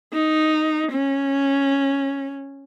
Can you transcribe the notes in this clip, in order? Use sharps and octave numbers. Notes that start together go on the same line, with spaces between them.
D#4
C#4